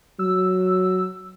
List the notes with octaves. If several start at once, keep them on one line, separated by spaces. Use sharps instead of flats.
F#3 E6